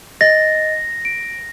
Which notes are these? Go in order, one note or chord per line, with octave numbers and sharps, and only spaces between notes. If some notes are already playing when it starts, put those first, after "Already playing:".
D#5 A6 A#6
D7